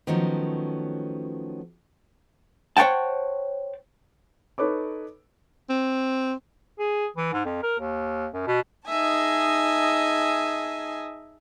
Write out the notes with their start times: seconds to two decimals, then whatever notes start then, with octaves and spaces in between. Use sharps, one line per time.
0.07 D#3 F3 F#3 A3 B3 C#4
2.77 C5 C#5 F#5 G5 A5
4.58 D#4 A4 B4 C#5 D6
5.69 C4
6.79 G#4
7.16 E3
7.33 G#2
7.45 F2
7.63 A#4
7.79 D#2
8.33 F#2
8.47 B2
8.89 D#4 G#4 D#5 E5 G#5 A5